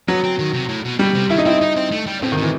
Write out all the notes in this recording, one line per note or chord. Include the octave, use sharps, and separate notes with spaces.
F#3 B3
C4
D#3
C3
A2
B2
B2 G3
C3
D#3 E4
D#4
C4 E4
D#4
C4
A3
G3
A2 C4
D#3
A2 E3